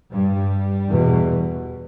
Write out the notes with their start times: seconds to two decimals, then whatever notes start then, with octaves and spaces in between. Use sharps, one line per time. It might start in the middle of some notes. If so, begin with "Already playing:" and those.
0.12 G2 G3
0.88 E2 B2